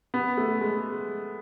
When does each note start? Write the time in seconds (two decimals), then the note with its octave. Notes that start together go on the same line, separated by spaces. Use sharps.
0.14 B3
0.37 A3
0.61 G#3